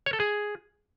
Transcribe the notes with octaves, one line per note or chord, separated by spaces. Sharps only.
C#5
A4
G#4